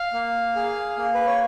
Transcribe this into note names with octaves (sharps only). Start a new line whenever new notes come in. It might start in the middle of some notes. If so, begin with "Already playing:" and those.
Already playing: F5
A#3
G#4
A#3
B4
C#5